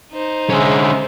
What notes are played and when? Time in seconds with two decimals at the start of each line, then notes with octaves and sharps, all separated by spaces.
0.12 D#4 C5
0.50 D3 G#3 C#4 E5